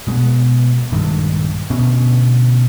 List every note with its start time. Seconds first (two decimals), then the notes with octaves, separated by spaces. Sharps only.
0.07 B2 G#3 A3 B3
0.92 A#1 G2 D#3 G#3
1.70 D2 B2 B3 C#4